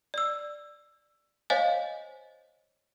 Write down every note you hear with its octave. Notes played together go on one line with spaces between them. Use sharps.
D5 E6
C5 C#5 D#5 F5 G#5